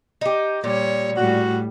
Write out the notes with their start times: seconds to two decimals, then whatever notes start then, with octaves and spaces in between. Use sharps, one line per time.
0.21 D#4 G4
0.64 A#2 G3 C#5
1.17 A2 G3 F#4